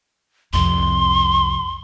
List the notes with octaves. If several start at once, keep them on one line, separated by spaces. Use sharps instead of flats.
C2 F2 C6